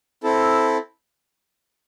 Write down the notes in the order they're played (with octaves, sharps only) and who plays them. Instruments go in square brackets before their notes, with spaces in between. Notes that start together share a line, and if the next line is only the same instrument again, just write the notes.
[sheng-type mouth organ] C4 E4 A4